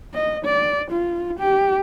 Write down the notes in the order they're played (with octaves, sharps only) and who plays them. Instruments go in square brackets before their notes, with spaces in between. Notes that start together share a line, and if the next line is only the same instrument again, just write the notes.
[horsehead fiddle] D#5
D5
F4
G4